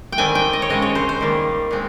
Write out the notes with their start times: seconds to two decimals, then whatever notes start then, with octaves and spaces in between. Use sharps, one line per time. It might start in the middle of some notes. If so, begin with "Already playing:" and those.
0.12 G5
0.18 D#3 G3 C4 G#5
0.35 G5
0.53 D#5
0.62 C#5
0.70 C#3 G#3 C4 D#5
0.82 C#5
0.95 C5
1.09 C5
1.21 D#3 G3 A#3
1.71 A#2 G#3 C4